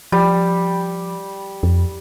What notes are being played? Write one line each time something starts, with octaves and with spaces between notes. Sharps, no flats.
F3 G3
F2